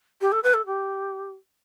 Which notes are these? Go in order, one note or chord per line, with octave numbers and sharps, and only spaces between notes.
G4
A4
B4
A4
G4